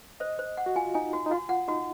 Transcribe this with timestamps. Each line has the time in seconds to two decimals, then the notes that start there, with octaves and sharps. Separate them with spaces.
0.20 C5 D#5
0.39 C5
0.57 F#5
0.66 F#4
0.76 F4 G#5
0.94 D#4 G#5
1.13 F#4
1.26 D#4
1.31 F4 F#4
1.49 F4 F#5
1.68 D#4 F#4